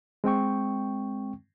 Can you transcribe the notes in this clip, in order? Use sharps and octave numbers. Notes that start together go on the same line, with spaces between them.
G#3 C4 G5 C#6